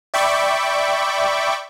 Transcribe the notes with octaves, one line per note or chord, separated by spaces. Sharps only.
D5 E5 G5 B5 C#6 D6